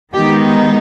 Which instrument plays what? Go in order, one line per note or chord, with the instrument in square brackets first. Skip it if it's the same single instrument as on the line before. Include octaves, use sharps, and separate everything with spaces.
[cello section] D#3 G#3 B3 D#4 G4